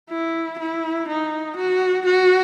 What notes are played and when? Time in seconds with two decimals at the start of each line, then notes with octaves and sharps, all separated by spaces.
0.10 E4
0.59 E4
1.08 D#4
1.57 F#4
2.06 F#4